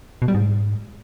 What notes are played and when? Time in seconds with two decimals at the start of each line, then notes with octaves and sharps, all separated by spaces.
0.22 B2
0.28 G3
0.35 G#2